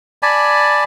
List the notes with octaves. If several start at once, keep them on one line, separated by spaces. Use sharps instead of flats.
D5 G#5 A5 B5